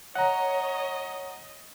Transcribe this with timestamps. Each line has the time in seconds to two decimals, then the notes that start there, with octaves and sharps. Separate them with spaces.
0.15 C#5 D#5 F#5 A#5